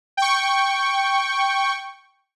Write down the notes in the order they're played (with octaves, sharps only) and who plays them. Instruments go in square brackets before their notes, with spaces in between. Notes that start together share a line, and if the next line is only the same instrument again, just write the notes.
[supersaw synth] G5 C#6